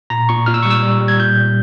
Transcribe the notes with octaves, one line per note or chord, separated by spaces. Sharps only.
A#2 A#5
A#2 C#6
A#2 F6
E6
G3 C#6
E6
G3
G3
G#6
A#2 G6
G3